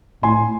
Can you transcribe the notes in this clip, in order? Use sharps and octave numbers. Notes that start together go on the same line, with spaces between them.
A2 G#5 C6